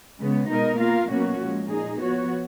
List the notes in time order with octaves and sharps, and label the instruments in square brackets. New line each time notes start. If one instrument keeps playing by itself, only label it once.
[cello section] C#3 G#3 B3
B2 G#3 D#4 A#4 D#5
A#3 F4 A#4 F5
B2 F#3 A#3 C#4 F#4
A#2 F3 G#3
A#2 G#3 D#4 G#4
F3 B3 F#4 C#5